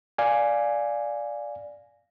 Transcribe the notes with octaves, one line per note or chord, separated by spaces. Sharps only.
D5 F5 G#5